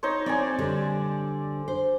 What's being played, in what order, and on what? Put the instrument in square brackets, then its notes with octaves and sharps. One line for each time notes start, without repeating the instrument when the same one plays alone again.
[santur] D#4 C5 C#5
[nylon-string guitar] C4 A4 C#5 [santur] D5 G#5
[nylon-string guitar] D3 G3
C5